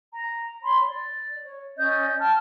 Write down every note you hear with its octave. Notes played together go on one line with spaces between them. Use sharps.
A#5
C#5 B5 C6
D5
C#5
C#4 D5 D#5 G6
G5 A5 F6